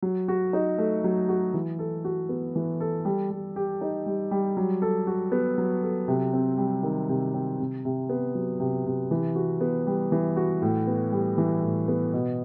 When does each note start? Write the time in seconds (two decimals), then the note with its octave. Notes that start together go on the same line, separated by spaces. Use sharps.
0.02 F#3
0.28 F#4
0.53 D#4
0.78 A3
1.04 F#3
1.29 F#4
1.54 E3
1.79 A4
2.05 F#4
2.29 B3
2.56 E3
2.80 A4
3.05 G3
3.30 G3
3.56 G4
3.81 D#4
4.06 G3
4.31 G3
4.57 F#3
4.82 A4
5.07 F#4
5.32 B3
5.58 F#3
5.83 A4
6.08 C3
6.33 C4
6.58 G3
6.83 D#3
7.09 C3
7.34 C4
7.59 C3
7.85 C3
8.09 B3
8.35 F#3
8.60 C3
8.86 C3
9.11 E3
9.36 F#4
9.61 B3
9.87 G3
10.12 E3
10.37 F#4
10.62 A2
10.87 B3
11.12 G3
11.38 E3
11.63 A2
11.88 B3
12.13 B2